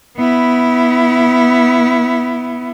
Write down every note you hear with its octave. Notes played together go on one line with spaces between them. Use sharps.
B3 E4